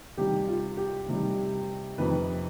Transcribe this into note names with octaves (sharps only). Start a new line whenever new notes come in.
C3 D#3 G3 G4
F4
G4
C3 D#3 G3
F2 C3 D#3 B4